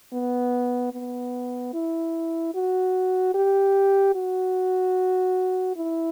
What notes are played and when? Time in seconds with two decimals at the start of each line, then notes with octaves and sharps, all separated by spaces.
0.13 B3
0.93 B3
1.74 E4
2.55 F#4
3.34 G4
4.15 F#4
5.77 E4